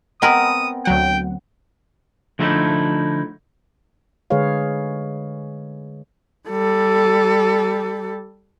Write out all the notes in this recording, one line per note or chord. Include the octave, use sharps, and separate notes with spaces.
B3 C4 A#4 D#5 G#5 B5 D#6
D2 F#3 F#5 G5
D3 F3 A3 D#4 E4 A4
D3 G#3 G#4 B4 C#5 F5
G3 A4